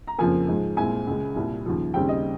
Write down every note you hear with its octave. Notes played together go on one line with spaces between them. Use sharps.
A#5
F2 C#3 F3 A#3 G#5
G#2 F3 G#3
C2 A#2 G#3 C4 G#5
C#2 C#3 G#3
C2 A#2 G3
D#2 C#3 F3
D#2 C#3 G3 C4 G5
D#5